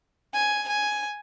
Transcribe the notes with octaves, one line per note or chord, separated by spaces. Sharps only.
G#5
G#5